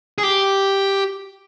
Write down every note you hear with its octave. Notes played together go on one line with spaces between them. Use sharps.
G#4
G4